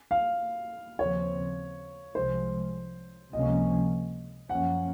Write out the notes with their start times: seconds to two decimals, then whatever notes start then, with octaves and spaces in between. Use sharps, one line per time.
0.11 F5
0.99 D#2 C#3 F3 C4 C#5
2.15 C2 C3 F3 G#3 C5
3.32 C#2 C3 F3 A#3 C#4 D#5
4.49 F#2 F3 A#3 C#4 F#5